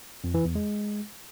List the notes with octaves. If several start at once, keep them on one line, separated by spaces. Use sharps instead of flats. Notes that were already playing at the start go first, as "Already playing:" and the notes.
F2
E3
E2
G#3